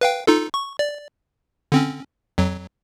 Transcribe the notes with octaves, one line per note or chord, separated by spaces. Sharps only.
B4 F5 G5
D#4 F4 A4
C#6
D5
D3 C4 C#4
F2 F#3